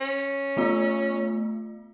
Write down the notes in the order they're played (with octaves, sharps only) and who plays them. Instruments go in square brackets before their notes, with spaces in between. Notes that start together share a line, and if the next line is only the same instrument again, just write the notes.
[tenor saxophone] C#4
[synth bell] A3 B3 F4